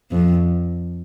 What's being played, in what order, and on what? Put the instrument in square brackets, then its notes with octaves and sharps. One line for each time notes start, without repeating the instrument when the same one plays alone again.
[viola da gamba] F2